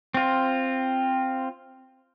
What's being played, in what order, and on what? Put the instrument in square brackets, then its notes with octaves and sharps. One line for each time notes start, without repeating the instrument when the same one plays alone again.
[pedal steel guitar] C4 F4